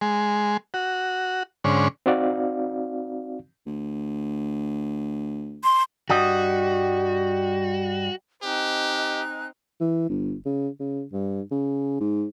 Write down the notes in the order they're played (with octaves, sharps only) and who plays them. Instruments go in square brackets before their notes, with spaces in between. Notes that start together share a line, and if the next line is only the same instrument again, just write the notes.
[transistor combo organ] G#3
F#4
G#2 D3 C#4
[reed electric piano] C4 D#4 F#4 D5 F5
[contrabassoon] D2
[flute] C6
[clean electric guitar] G2 G3 D#5 [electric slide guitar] F#4
[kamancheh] C4 D#4 [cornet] G4 [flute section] D#5 G#5 F#6
[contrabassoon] E3
G1
C#3
C#3
G2
C#3
G#2